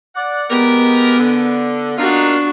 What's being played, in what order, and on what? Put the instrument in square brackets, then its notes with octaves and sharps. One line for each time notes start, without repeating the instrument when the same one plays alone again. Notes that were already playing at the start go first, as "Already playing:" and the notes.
[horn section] D5 F#5
[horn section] G#3 G4 A#4 [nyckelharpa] B3
[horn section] D3
[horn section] A#3 D#4 F4 [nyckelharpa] D4 F#4